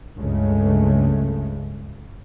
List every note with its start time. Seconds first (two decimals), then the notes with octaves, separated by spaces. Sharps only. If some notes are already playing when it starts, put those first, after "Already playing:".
0.19 C#2 G2 C#3 G#3 A3